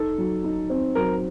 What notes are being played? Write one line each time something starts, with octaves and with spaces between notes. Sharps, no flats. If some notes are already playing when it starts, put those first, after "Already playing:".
Already playing: D#4 A4
F#3
D#4
C4
F#3 A#4